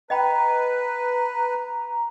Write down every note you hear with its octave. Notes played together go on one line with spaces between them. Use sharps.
B4 D#5 G5 A#5 B5